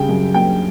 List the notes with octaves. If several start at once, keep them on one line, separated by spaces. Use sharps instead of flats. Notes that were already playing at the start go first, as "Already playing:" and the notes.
Already playing: C#3 G3 G5
F#2
F#1 G5